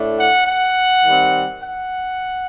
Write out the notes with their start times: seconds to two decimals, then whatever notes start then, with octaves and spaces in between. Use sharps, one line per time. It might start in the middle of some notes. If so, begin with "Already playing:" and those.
Already playing: A2 A3 D4
0.18 F#5
0.46 F#5
1.04 D#3 G3 C4
1.63 F#5